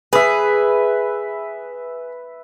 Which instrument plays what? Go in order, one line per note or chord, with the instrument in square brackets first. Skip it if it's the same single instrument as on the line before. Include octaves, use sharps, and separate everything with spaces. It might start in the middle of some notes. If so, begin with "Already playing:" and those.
[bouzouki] G#4 [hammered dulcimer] B4 E5